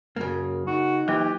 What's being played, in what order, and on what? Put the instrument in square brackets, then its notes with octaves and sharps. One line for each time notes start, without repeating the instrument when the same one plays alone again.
[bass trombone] F#2 [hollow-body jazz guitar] C#3 A#3
[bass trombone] D#4 [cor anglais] F#4
[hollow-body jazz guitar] E3 [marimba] F#3 A#3 [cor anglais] G4